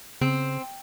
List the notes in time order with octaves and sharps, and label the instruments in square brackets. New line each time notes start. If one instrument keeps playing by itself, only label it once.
[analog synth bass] C#3 [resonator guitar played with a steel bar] C4